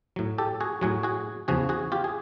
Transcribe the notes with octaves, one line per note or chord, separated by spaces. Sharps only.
A2 F#3
G4 A4
F#4 G#4
A2 F#3 F#4 G#4
F#4 G#4
E2 C#3 F3 F#4 G#4
F#4 G#4
F4 G4
G#4